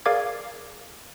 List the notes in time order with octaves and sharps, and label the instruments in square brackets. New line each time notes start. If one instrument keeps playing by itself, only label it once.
[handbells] G#4 A#4 D5 F5 D6 G#6